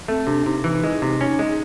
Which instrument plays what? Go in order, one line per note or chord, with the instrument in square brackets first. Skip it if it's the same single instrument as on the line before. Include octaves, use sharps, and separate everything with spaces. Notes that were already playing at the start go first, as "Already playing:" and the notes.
[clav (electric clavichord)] A3 [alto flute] C4
[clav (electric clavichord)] C3 [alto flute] D4
[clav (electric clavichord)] C3 [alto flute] D#4
[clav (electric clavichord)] E3
G#3
C3
C#4
G#3